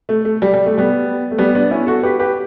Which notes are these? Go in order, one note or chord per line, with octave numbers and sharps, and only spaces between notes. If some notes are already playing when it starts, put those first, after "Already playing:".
A3
A3
G3
G3
A3
G3 B3
A3
G3 B3
B3 D4
C#4 E4
F#4 A4
G4 B4
G4 B4